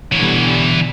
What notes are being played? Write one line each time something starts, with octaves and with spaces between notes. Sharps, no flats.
B2 D3 E3 G3 C#5